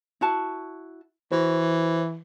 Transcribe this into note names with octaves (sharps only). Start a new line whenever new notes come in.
E4 F#4 A5
E3 F#4 C5